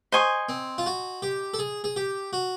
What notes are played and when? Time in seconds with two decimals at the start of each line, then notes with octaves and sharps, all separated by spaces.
0.12 C5 D#5 G#5 C#6
0.49 C4
0.78 F4
0.86 F#4
1.22 G4
1.54 A4
1.59 G#4
1.84 G#4
1.96 G4
2.33 F#4